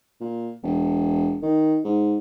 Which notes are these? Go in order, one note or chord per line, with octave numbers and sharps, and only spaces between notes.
A#2
E1
D#3
G#2